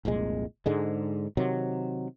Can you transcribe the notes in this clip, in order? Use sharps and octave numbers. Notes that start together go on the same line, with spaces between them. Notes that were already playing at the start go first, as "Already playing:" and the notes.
F1 C2 A#2 G#3
G#2 D3 G#3
C3 D#3 F#3